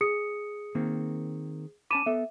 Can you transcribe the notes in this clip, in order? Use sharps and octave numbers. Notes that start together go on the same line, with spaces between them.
G#4 D#6 C#7
D#3 A#3 C4
C#4 A5 B5 D6 D#7 E7
B3 A4 E5